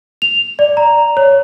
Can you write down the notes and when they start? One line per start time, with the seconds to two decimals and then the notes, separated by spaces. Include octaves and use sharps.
0.22 F7
0.59 D5
0.77 A#5
1.17 C#5